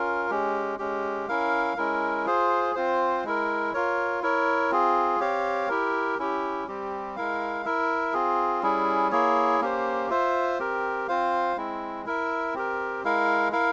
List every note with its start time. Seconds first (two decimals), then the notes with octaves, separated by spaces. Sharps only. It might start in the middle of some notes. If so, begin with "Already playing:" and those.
Already playing: C#4 F4 A#4
0.30 G#3 C#4 G4
0.79 G#3 C#4 G4
1.28 C#4 E4 A#4 F5
1.77 G#3 C#4 E4 A#4
2.26 F4 G#4 C5
2.75 C4 F4 C5
3.24 G#3 E4 A#4
3.74 F4 A#4 C#5
4.22 E4 A#4 C#5
4.71 C4 F4 G#4
5.20 C4 G4 C#5 F5
5.68 E4 G4 A#4
6.19 C#4 E4 G4
6.68 G3 C4 G4
7.16 G#3 E4 A#4 F5
7.65 E4 A#4 E5
8.13 C4 F4 G#4
8.62 G3 C#4 E4 G#4
9.11 A#3 E4 G#4 C#5
9.61 A#3 C#4 G4 C5
10.10 F4 C5 E5
10.59 C4 G4 A#4
11.08 C4 F4 C5 F5
11.57 G#3 C4 E4
12.06 E4 A#4 E5
12.54 C4 G4 A#4
13.04 G#3 E4 A#4 F5
13.52 E4 A#4 F5